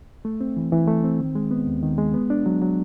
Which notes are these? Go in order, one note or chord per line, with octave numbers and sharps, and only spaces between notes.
A3
C4
E3
E3
A3
C4
D#3
G#3
B3
D#2
D#3
G#3
B3
D4
F#3
F#3